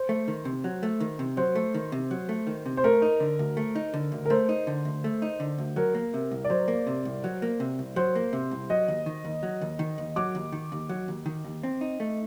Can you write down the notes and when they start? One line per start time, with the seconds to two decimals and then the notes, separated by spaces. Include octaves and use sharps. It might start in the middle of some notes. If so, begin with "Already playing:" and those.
Already playing: C5
0.09 A3
0.28 D#3
0.45 C3
0.64 F#3
0.83 A3
1.00 D#3
1.19 C3
1.37 F#3 C5
1.55 A3
1.74 D#3
1.92 C3
2.11 F#3
2.29 A3
2.47 D#3
2.66 C3
2.77 C5
2.84 A3 A#4
3.02 D#4
3.20 D3
3.39 D2
3.57 A3
3.75 D#4
3.94 D3
4.12 D2
4.26 A#4
4.30 A3 C5
4.49 D#4
4.67 D3
4.85 D2
5.04 A3
5.22 D#4
5.40 D3
5.58 D2
5.76 F#3 A#4
5.95 A#3
6.14 C3
6.31 C2
6.44 D5
6.50 F#3 C5
6.68 A#3
6.87 C3
7.05 C2
7.24 F#3
7.42 A#3
7.60 C3
7.79 C2
7.96 F#3 C5
8.15 A#3
8.33 C3
8.51 C2
8.70 F#3 D#5
8.88 D#2
9.06 D#3
9.25 D#2
9.43 F#3
9.61 D#2
9.79 D#3
9.98 D#2
10.16 F#3 D6
10.35 D#2
10.52 D#3
10.72 D#2
10.89 F#3
11.08 D#2
11.26 D#3
11.44 D#2
11.63 C4
11.81 D#4
12.00 A3